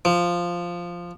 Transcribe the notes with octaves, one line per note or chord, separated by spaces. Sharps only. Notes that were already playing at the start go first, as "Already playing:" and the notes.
F3